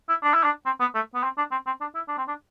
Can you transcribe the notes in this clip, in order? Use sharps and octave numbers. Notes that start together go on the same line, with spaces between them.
E4
D4
E4
D4
C4
B3
A3
B3
C4
D4
C4
C4
D4
E4
D4
C4
D4